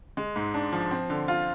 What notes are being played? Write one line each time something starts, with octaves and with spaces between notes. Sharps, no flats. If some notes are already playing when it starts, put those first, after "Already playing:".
G#3
G#2
D4
F3
C4
D3
F4